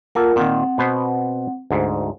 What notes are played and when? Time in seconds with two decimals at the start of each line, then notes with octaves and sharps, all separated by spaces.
0.15 A#3 F4 A4 A#4 F#5
0.36 A#2 D#3 C4 F#5
0.78 B2 B3 C5
1.71 D2 G#2